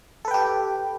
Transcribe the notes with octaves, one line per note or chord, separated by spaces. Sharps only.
G4 A4 B4 G5